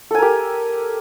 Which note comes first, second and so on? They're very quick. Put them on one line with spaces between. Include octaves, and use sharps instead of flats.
A4 G#5 A#4 G4